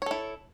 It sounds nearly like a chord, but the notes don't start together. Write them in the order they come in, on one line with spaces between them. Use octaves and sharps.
C#5 A4 E4